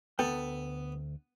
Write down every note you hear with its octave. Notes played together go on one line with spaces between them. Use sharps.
D2 B3 A4 G5